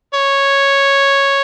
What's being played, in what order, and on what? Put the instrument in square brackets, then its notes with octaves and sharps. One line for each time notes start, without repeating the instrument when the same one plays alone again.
[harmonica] C#5